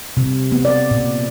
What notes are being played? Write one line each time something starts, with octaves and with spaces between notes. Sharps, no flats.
C3
B3
D5
A#2